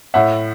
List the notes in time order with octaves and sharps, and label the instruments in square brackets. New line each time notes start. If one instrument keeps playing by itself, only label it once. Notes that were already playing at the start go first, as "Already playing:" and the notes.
[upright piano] A2 E5 F#5